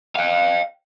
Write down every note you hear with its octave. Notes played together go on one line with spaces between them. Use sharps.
F5 G5